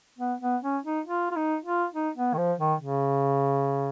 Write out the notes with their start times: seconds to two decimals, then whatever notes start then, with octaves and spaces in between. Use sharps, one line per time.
0.19 B3
0.42 B3
0.63 C#4
0.85 D#4
1.06 F4
1.31 F4
1.36 D#4
1.65 F4
1.94 D#4
2.16 B3
2.34 D#3
2.38 F3
2.59 D#3
2.81 C#3